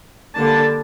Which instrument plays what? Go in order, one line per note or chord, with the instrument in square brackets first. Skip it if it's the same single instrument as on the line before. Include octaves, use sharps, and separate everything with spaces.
[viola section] D3 G3 A#3 D4 A5